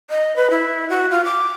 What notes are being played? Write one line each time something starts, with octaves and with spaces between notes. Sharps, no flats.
D#5
B4
E4
F#4
F4
D6